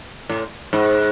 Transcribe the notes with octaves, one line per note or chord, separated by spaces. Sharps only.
A2
G#2